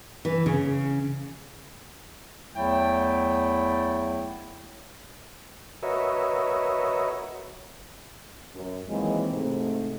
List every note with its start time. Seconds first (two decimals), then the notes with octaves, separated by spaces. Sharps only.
0.25 E3
0.46 C#3
2.53 E2 F#3 A3 E4 G5
5.83 F#4 A#4 B4 C#5 D#5 E5
8.54 F#2
8.89 D#3 E3 F#3 G#3 A#3 C4
9.32 G#2 C3 A3